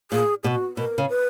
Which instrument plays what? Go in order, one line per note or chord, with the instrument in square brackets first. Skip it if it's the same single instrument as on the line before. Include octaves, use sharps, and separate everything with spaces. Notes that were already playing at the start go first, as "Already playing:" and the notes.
[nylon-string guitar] A#2 [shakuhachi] G#4
[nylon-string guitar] B2 [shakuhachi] F#4 G#4
[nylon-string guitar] B2 [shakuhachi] A#4
[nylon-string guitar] C#3
[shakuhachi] B4